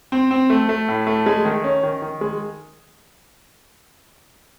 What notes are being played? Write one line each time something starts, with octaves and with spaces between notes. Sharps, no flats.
C4
C4
A3
A3
A2
A3
G#3
D#3
C#4
D#3
D#3
G#3